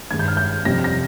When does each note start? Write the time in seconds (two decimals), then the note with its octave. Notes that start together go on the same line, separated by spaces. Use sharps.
0.11 G2 D#3 G#3 G#6
0.19 G6
0.28 F6
0.37 G6
0.65 F2 C3 G3 A#6
0.84 A#6